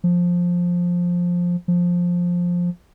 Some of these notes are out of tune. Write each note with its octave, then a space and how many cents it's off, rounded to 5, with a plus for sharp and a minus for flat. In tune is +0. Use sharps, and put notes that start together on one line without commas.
F3 +10
F3 +10